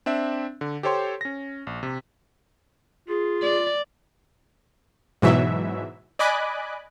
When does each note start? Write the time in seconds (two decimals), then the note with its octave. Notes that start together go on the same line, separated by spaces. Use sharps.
0.06 C4 D4 E5
0.61 D3
0.83 G4 A4 C5 C#5 G5 C6
1.21 C#4 A#6
1.67 A#1
1.83 C3
3.09 F4 G#4
3.42 D5
5.22 G#2 B2 E3 F#3 E5
6.19 D5 D#5 G#5 B5 D6 F#6